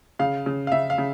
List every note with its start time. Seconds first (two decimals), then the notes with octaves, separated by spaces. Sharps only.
0.19 C#3 F5
0.46 C#3
0.67 F5
0.72 C#3 E5
0.90 F5
0.98 C#3